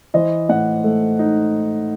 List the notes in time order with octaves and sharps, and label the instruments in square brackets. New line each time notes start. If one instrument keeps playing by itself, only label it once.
[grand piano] E3 C5 D#5
A2 D#5 F#5
A3
D#4